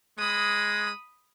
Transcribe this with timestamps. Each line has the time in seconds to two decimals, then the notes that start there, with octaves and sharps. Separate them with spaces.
0.19 G#3 B5 D#6